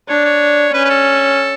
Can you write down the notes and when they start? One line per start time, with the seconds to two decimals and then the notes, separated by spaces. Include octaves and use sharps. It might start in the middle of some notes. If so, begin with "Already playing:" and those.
0.09 D4 C#5
0.25 C#5
0.73 C#4 B4
0.85 B4
0.90 A4